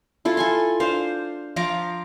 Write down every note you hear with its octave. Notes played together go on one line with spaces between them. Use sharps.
E4 F4 A4
A4 G#5 C6
D4 C5 F5
F3 F4 A#5 D6